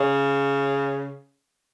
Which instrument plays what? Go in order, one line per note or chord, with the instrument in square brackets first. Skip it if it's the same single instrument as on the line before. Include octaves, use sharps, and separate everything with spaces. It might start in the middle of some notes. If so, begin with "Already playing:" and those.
Already playing: [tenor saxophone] C#3